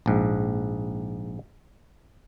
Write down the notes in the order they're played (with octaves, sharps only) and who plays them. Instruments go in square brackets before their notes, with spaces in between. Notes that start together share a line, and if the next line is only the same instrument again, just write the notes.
[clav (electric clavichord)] A#1 G#2